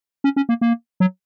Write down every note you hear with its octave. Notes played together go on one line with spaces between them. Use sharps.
C#4
C#4
A#3
A#3
F#3